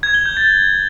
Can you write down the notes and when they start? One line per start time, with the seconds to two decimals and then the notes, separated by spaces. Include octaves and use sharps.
0.03 G#6
0.14 G7
0.26 G6
0.37 A6